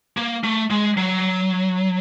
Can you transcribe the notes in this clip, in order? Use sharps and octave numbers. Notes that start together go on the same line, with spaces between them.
A#3
A3
G#3
F#3